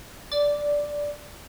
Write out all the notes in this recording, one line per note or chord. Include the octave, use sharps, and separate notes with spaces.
D5